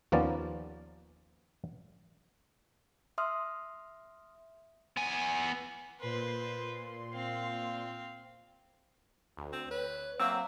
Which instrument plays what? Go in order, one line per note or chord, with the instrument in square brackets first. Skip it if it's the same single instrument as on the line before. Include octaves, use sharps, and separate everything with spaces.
[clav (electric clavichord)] D#2 F3 A#3 B3 C#4 D5
[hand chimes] E5 C6 D#6 F6
[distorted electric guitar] B3 G#5
[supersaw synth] A#2 C6 [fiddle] B4 C5
[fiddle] C4 F5
[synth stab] D2
[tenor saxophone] C4
[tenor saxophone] B4 [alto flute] C#5
[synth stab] F#3 A#3 E5 [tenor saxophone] C4 [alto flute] F5 [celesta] E6